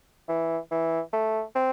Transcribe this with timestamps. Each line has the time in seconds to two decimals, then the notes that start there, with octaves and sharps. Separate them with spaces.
0.29 E3
0.71 E3
1.13 A3
1.55 C4